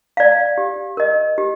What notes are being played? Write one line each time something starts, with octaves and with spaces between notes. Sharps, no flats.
D5 F5
G4
A#4 D#5
G4